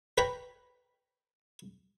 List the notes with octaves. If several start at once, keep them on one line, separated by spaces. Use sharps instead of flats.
A#4 B4 C#5 G5 A#5 B5